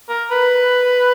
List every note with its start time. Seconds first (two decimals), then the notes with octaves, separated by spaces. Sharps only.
0.09 A#4
0.31 B4